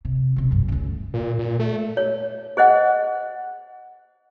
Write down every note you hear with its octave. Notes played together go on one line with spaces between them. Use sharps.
C3
B1 C3
B1 G2
D2 C#3
A#2
A#2
A3
C#5
G#4 C5 D#5 F#5